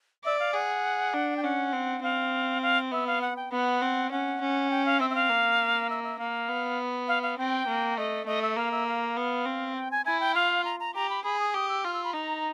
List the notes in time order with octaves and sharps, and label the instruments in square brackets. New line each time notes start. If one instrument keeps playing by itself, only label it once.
[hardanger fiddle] D5 [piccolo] E5
[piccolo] F5
[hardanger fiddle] G#4 [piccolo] F#5
[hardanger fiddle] D4
[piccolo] G5
[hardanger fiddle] C#4 [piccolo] F#5
[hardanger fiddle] C4
[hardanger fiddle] C4 [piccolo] F5
[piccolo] F5
[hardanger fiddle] B3 [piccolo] E5
[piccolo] F5
F#5
G5
[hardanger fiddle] B3 [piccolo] F#5
[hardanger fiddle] C4
[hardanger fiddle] C#4 [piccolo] F#5
[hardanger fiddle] C#4
[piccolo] G5
F5
[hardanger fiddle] C4 [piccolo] E5
[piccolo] E5
F5
[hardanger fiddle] A#3
[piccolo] E5
E5
[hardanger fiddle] A#3 [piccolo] F5
[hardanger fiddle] B3
[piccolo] F5
F5
[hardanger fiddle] C4 [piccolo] G5
[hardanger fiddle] A#3
[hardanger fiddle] A3 [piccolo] D#5
[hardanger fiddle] A3 [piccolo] D#5
[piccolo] E5
[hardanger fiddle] A#3 [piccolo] F5
[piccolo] E5
F5
[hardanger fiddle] B3
C4
[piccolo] G5
G#5
[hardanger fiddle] E4 [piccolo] G#5
[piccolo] G5
[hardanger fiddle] F4 [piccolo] F5
[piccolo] A#5
A#5
[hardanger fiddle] G4 [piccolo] A#5
[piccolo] B5
[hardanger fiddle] G#4 [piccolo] B5
[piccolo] D#6
[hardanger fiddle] G4 [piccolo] D#6
[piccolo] E6
[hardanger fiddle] F4 [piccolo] F6
[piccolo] E6
B5
[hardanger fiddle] D#4 [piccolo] A#5